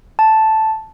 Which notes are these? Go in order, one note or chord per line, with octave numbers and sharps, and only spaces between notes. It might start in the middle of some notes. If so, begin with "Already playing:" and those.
A5